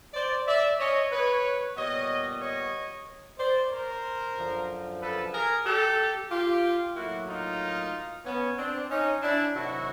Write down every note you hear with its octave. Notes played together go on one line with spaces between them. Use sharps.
C5 D5
D5 E5
C#5 D#5
B4 C#5
A#2 G3 B3 C#5 D#5
C#5 D#5
C5 D5
A#4 C5
F#2 D3 F3
A4 B4
G#4 A#4
G4 A4
F4 G4
A2 F#3 A#3 E4 F#4
D#4 F4
B3 C#4
C4 D4
C#4 D#4
D4 E4
C3 D#3 F#3 E4 F#4